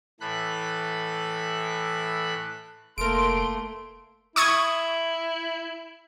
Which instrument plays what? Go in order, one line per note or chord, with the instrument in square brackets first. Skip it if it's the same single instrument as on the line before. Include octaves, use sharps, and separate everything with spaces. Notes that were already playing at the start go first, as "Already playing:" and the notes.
[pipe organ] A2 E3 A4 B5 F#6
[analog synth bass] F1 [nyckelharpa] A3 A#3 [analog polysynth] A#4 D7 [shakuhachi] C6
[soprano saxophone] E4 [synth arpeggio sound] C#6 D#6 G#6